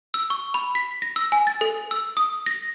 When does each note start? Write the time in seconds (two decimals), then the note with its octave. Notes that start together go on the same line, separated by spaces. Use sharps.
0.14 E6
0.30 C#6
0.54 B5
0.75 B6
1.02 A#6
1.16 E6
1.32 G#5
1.47 A6
1.61 A4
1.91 E6
2.17 D#6
2.46 A#6